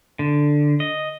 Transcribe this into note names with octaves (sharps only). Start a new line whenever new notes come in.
D3
D#5